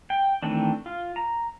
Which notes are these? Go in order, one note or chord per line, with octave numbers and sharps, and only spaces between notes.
G5
D#3 E3 A3 C4 D4
F4
A#5